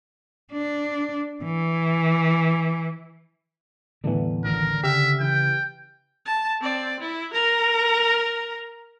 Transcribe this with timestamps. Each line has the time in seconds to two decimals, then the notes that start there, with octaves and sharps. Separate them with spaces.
0.52 D4
1.44 E3
4.04 E2 A2 D3 E3 G3 B3
4.45 A1 D#3 F#3 A#4
4.84 C#3 G4 E5 F6
5.20 E3 G5
6.26 A5
6.62 C4 D5
7.00 E4
7.34 A#4 A#5